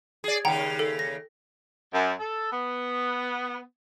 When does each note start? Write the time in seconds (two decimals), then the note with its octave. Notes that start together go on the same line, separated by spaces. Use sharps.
0.24 G#4 D5
0.45 D#2 C#3 F#5 G5 A#5
0.79 A4
0.99 A#6
1.93 F#2
2.19 A4
2.52 B3